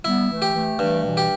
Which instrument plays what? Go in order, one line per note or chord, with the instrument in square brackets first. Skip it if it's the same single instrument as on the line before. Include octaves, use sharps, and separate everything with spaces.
[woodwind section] G3 B3 [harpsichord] E4
[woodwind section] E3 A3
[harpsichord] G4
[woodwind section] E3 A3
[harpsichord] G2 [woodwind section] E3 A3
[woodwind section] B2 E3
[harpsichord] G4